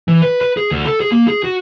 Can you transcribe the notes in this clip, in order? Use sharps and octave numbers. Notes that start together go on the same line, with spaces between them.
E3
B4
B4
G#4
D2
A4
G#4
A#3
G#4
F#4